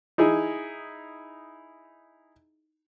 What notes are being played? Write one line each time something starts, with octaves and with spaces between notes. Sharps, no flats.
D#4 E4 G#4